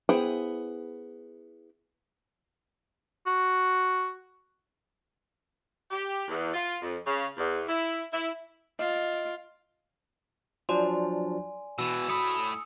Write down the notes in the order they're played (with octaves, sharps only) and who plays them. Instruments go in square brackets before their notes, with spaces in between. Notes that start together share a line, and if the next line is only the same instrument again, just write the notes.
[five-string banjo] B3 E4 G#4 C5 G5
[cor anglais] F#4
[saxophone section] G4
E2
F4
F2
C#3
E2
E4
E4
[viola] F4 [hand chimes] D#5
[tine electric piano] F3 F#3 D4 [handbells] D5 C6 [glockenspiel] G#5
[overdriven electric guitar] B2 E3 [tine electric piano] F#4 [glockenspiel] E6
[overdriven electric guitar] A2 B5 [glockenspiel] D#6 C#7